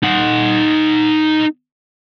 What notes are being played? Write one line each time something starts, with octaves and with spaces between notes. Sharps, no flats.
D#4 F#5